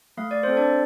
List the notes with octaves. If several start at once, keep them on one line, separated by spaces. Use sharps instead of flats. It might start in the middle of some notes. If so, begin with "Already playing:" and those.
A3 F5
D5
C4 A4 C5
D4 D5